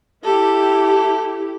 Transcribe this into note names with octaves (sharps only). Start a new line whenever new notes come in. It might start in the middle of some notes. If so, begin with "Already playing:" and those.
E4 G4 A4